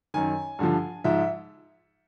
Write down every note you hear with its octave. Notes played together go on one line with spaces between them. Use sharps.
F#2 D#3 G#5
G2 D3 F3
G#2 F3 E5